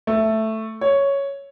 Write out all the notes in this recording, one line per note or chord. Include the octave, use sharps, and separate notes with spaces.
A3
C#5